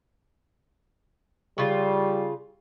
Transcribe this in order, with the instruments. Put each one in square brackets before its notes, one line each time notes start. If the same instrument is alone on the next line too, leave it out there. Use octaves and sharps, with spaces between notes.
[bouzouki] C#3 F4 [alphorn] G3